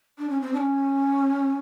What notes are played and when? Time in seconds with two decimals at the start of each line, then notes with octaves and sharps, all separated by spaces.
0.18 D4
0.29 C#4
0.41 C4
0.53 D4
0.58 C#4